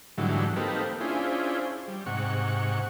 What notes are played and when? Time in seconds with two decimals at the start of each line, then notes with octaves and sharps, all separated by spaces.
0.18 G#2 D3 E3 F#3 G3 A3
0.56 A#3 C4 D#4 G4 A4 B4
1.01 C#4 D4 E4 F4 G#4 C5
1.88 G3
2.06 G#2 C3 F#5 C#6